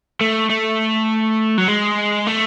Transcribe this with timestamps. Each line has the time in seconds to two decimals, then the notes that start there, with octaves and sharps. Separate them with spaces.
0.21 A3
0.50 A3
1.58 F#3
1.68 G#3
2.27 A3